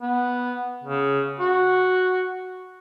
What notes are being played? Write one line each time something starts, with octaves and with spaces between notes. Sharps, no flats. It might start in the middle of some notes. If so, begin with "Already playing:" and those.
B3
C#3
F#4